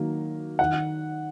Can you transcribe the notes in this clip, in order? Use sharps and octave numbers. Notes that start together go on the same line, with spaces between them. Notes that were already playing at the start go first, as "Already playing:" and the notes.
Already playing: D#3 F#3 A#3
D#3 F#5